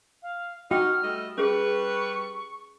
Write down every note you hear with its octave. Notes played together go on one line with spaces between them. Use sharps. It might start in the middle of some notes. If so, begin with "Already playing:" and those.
F5
D#4 F#4 G5 F6
G3 A3 D#5
G3 C#4 G#4 B4 C#6